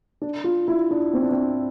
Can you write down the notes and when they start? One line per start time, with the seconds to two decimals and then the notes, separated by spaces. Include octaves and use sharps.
0.22 D4
0.44 F4
0.68 E4
0.91 D4
1.13 C4
1.22 D4
1.31 C4